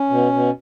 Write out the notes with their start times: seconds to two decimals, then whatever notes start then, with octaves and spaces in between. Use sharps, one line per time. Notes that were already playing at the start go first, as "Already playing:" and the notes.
Already playing: C#4
0.10 B2
0.32 B2